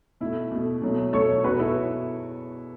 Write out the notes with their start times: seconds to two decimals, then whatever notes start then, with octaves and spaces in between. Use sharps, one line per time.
0.20 B2 A3 E4
0.52 B2 A3
0.82 B2 F#3 A3
1.13 B2 F#3 A3 A4 C#5
1.44 E2 B2 B3 F#4 B4
1.59 E4 A4